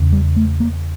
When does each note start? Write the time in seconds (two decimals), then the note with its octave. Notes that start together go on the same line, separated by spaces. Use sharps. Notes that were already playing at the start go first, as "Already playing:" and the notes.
Already playing: E2 C#3
0.12 G3
0.36 A3
0.60 A#3